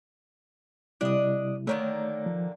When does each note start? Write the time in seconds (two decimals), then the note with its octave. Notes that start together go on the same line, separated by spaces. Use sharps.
1.01 C3 G3 D4 E4 D#5
1.67 D3 D#3 A3 A#3 C#5
2.26 F3